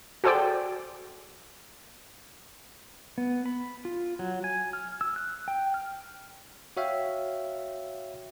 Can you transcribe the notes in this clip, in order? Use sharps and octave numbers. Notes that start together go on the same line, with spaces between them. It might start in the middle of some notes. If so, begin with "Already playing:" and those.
F#4 G#4 A4 C5 D5 G5
B3
B5
F4
F#3
G#5
F6
E6
F#6
G5
F6
F#4 C#5 E5 F5 G5